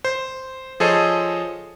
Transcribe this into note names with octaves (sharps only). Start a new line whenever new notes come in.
C5
F3 G#4 A4 C5 C#5 D#5